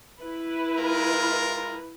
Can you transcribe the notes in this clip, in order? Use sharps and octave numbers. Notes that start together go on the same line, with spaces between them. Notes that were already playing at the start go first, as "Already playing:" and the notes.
E4 B4
G#3 F4 A#4